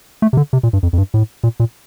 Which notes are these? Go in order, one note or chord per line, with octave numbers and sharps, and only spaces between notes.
A3
C3
D3
C3
A#2
G2
F2
F2
G2
A2
A#2
A#2